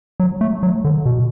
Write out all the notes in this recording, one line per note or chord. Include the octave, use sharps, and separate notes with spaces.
F#3
A3
F#3
D3
B2